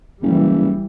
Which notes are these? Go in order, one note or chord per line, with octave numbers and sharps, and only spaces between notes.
F#1 E3 G3